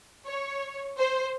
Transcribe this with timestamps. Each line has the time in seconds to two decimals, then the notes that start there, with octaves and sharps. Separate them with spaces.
0.28 C#5
0.97 C5